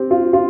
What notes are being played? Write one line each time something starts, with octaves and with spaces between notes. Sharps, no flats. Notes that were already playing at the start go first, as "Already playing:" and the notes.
Already playing: C4 G4
F4
F4